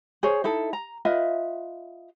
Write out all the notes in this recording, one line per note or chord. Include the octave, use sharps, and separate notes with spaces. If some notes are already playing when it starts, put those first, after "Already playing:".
G#4 C5 C#5
D#4 E4 A4
A#5
F4 B4 D#5 E5